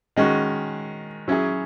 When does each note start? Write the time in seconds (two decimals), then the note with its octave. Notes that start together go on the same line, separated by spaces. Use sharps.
0.16 D#3 G#3 C#4 F#4
1.28 F#3 C#4 E4 G#4